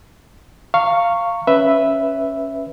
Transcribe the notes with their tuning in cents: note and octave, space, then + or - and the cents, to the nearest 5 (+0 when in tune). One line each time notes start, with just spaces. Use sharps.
F5 -10 A#5 -30 C#6 +0
C#4 +0 B4 +5 E5 +0